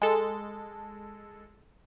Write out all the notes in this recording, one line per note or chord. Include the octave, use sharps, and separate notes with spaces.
G#3 A4